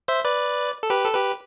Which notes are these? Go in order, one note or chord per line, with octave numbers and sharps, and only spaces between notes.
C5 E5
B4 D5
A4
G4 B4
A4
G4 B4